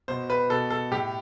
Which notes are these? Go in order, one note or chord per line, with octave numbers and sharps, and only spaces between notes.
B2 C5
B4
B2 A4
A4
A2 G4